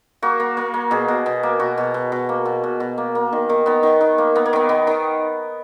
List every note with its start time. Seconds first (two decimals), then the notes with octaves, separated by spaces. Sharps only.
0.22 A#3 F#4
0.40 A#3
0.57 A#3
0.74 A#3
0.91 B2 G#4
1.08 B2
1.26 B2
1.43 A#3
1.59 B2 F#4
1.78 B2
1.94 B2
2.12 B2
2.29 A#3
2.45 B2
2.64 B2
2.80 B2
2.98 A#3
3.15 A#3
3.33 D#3
3.49 D#3
3.66 D#3 B3
3.83 D#3
4.01 D#3
4.18 A#3
4.35 A#3 B3
4.46 A#3
4.53 D#3 B3
4.69 D#3 B3
4.87 D#3